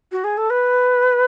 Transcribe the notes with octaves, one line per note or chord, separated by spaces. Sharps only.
F#4
G#4
A4
B4